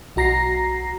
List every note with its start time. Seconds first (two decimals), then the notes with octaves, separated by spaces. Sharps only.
0.16 B1 F#4 A#5 A#6 C7